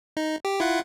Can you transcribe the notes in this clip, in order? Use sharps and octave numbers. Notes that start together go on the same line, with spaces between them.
D#4
G4
E4 F4 F#5